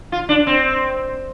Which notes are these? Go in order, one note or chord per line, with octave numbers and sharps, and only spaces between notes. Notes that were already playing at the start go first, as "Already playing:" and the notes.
F4
D4
C4